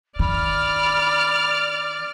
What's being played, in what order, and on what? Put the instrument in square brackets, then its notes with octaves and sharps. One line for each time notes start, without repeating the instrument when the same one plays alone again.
[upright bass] D#3 [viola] D5 [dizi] B5 [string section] F6